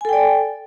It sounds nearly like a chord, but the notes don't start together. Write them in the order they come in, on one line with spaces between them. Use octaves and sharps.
G#5 A4 G5 D5